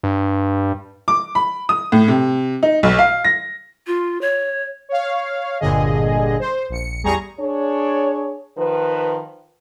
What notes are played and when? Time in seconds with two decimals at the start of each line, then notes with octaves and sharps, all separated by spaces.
0.03 G2
1.08 D6
1.35 B5
1.69 D#6
1.92 A2
2.08 C3
2.63 D#4
2.83 B1
2.99 F5
3.25 A#6
3.87 F4
4.21 C#5
4.89 C#5 F5
5.60 G1 G2 A#2 D3 G#4 D#5
6.39 C5
6.69 A#1 C#7
7.02 A1 E2 G3 G#4 A#5 C#6
7.40 D4 G#4 C#5
8.57 D#3 F3 B4